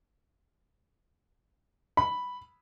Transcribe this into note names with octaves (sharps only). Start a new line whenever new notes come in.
B5